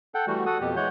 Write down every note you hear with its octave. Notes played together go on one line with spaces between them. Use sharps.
A4 F#5 G5
E3 G3 A3 F#4
F#4 A4 F#5 D#6
F2 B2 G4
E3 G#3 C#5 F#5 G6